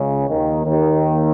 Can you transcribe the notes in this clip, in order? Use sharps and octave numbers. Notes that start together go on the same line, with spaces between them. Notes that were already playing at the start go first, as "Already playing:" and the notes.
Already playing: C#2 C#3
D#2 D#3
D#2 D#3